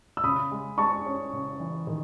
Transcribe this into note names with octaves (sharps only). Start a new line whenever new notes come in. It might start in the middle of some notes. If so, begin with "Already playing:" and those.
E6
C#3 B5 D#6
G#3
G#3 A5 C#6
C#4
C#3
E3
D#3